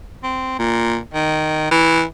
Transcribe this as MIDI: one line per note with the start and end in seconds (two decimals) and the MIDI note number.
0.24 0.55 60
0.59 0.98 46
1.14 1.69 51
1.71 2.03 52